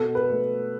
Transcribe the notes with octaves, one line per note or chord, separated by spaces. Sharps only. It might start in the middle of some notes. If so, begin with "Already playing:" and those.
Already playing: B2 A4
B4
A3